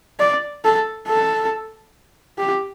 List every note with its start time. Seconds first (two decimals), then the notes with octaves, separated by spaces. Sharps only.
0.20 D5
0.65 A4
1.08 A4
2.39 G4